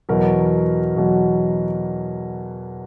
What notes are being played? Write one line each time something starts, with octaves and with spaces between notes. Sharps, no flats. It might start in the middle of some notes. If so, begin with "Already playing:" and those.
E2 B2 F#3 A#4
E2 B2 F#3